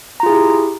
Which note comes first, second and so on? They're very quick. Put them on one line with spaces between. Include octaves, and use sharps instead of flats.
A#5 F4 G#4 E4 G4